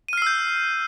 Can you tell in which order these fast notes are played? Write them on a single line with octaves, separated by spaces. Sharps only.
D#7 F6 C7 E6 G6